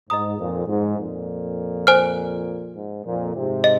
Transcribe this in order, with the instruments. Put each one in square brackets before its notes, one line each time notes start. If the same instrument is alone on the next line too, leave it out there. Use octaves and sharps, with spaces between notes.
[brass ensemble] G#2 [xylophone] D#5 A#5 D#6
[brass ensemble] F2 A#2
G#2
F2 A#2
[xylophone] C5 G#5 F6
[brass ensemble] G#2
F2 A#2
G#2 C3
[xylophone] D#5